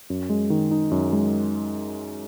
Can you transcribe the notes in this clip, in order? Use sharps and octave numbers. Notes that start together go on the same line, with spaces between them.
F#2
G#3
D#3
D#4
F#2
G#3